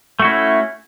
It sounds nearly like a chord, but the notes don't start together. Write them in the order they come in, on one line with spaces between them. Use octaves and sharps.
A3 F#4 E4 C#4